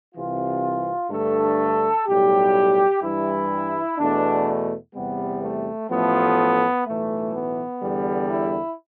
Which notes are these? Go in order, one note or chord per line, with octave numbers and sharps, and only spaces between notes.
C2 C3 E3 F4
G2 D3 A3 A4
B1 A2 G3 G4
G2 E3 G3 E4
E2 B2 A3 D4
E2 C3 G3 B3
A3
A1 A2 F3 A3 B3
B1 A2 E3 A3
B3
E2 D3 G3
E4